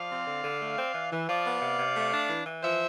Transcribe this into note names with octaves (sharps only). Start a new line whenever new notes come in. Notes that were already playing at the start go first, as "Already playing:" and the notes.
Already playing: F3 D5 F5
C4
D3
D3
A3
C4
E3
E3
F3 D5 F5
B3
C3
C3
A3
D4
E3
E3
F3 C5 E5